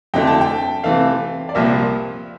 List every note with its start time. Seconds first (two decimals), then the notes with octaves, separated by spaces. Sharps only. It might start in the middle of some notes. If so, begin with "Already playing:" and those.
0.14 F2 D3 A3 E4 G5
0.27 A5
0.41 G5
0.84 C3 E3 A3 F5
1.49 D5
1.55 C2 A#2 F3 A#3 E5